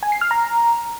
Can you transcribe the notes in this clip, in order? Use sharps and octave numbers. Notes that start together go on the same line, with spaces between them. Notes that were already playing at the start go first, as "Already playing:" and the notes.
G#5
C7
F6
A#5